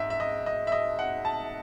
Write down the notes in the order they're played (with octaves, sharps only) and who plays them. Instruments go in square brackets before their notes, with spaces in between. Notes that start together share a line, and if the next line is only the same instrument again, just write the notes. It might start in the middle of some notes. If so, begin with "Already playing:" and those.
Already playing: [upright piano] G#2 D#5 E5
E5
D#5
D#5
E5
D#5
F#5
A5